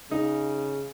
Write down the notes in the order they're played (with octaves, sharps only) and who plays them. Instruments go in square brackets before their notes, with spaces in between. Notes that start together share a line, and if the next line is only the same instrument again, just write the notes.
[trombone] C#3 [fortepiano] D#4